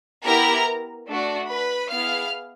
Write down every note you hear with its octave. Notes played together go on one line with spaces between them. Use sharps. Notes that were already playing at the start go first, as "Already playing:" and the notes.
B3 E4 G4 A#4 A#5
A3 D4 F#4
B4 B5
B3 E4 G#4 F5 F6